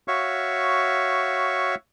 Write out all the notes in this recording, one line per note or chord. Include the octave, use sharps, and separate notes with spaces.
F#4 C#5 E5 F5 C#6